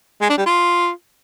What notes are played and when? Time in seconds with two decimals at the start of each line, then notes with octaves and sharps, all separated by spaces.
0.21 G#3
0.30 D4
0.38 G3
0.46 F4